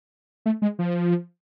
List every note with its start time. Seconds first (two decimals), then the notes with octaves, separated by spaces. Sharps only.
0.46 A3
0.62 G#3
0.79 F3